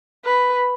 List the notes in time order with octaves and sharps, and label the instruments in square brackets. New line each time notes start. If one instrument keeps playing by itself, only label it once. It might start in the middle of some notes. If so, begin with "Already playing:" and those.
[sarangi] B4